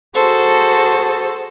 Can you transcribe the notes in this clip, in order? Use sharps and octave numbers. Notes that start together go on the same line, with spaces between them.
F#4 G#4 A4 C5